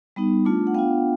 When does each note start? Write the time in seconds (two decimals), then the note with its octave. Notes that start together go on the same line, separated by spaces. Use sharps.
0.16 G3 B3 D#4
0.45 A3 D4 F4
0.67 F#5
0.75 B3 D4 F4 F5 G5